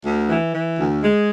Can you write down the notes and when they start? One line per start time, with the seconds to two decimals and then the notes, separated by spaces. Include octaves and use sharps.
0.05 D2
0.29 E3
0.54 E3
0.78 D2
1.02 G#3